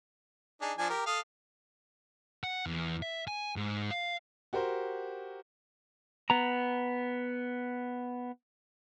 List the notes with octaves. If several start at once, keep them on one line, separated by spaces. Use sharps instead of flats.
D4 D#4 G#4
F3 D4 G#5
G4 A#4
A4 F5 D#6
F#5
E2
E5
G#5
G#2
F5
F#4 G4 A#4 C5
B3 A#5